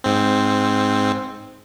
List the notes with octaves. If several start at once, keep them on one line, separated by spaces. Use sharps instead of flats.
G#2 C4